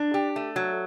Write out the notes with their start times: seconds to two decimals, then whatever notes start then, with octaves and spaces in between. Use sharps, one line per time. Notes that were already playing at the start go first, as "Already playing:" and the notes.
Already playing: D4
0.14 G4
0.36 A3
0.56 F#3